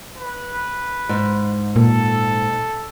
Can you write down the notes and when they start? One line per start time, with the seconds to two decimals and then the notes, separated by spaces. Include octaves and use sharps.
0.18 B4
1.09 G#2
1.76 A#2 A4